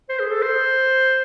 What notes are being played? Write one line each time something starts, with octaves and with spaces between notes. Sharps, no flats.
C5
G#4
A4
C5